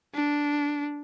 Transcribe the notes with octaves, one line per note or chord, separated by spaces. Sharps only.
D4